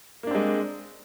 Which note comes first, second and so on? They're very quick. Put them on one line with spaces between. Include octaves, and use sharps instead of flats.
A#3 D4 C4 G#3